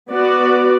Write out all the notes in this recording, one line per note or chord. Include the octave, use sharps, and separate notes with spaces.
B3 F#4 B4 D5